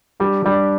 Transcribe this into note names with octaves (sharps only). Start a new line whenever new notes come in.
G3 D4 G4
G3 D4 G4